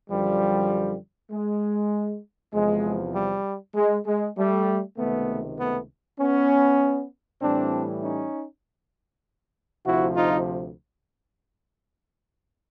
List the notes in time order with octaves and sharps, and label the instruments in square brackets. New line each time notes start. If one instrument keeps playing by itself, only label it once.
[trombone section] F#2 D3 F3 G3
G#3
E2 C3 F3 G#3
G3
G#3
G#3
G3 A3
C#2 C3 D#3 A3 B3
A3 B3
B3 C#4
A2 E3 G3 C4 D4
C#4 D#4
D2 C3 F3 E4 F#4
D#4 F4